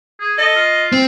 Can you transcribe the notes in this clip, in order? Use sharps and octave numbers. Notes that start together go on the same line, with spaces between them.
G#4
A4 D#5
F4
C4